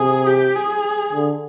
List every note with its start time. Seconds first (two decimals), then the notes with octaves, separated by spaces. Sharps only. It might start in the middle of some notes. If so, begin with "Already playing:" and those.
Already playing: C3 G#4
0.27 G4
0.55 G#4
1.13 D3